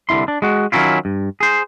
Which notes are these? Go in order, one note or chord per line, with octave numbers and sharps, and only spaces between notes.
C2 D3 E4 C6
D4
G#3 F#4
D#3 F#3 C#4 E4 F4
G2
G#4 C5